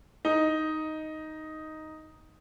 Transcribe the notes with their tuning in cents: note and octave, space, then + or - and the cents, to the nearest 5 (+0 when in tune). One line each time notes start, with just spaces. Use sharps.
D#4 +5